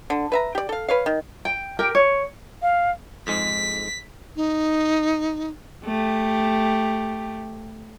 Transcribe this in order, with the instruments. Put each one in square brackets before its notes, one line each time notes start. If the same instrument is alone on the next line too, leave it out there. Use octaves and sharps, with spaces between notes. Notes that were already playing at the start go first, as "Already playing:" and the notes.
[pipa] D3
B4 E5 A#5
G4 D5
A4 F5
B4 C#5 F5
D#3
[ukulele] G5
G4 A#4 G5
C#5
[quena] F5
[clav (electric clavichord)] F2 G#2 G#3 [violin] B6
[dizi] D#4
[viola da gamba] A3 G4